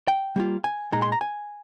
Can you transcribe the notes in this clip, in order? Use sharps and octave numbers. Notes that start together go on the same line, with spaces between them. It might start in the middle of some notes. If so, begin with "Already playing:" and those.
G5
G3 A#3 F4
G#5
A#2 G#3 D#4 A#5
C6
A#5
G#5